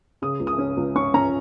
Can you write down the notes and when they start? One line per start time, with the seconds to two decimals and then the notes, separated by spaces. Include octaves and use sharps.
0.22 C#3 D#6
0.40 C#2
0.47 D#6
0.58 C#4
0.77 C#2
0.96 C#4 C#6
1.14 C#4 A#5